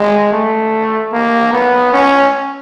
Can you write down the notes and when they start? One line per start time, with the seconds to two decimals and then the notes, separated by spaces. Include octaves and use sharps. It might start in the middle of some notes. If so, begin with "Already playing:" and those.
Already playing: G#3
0.32 A3
1.13 A#3
1.52 B3
1.93 C#4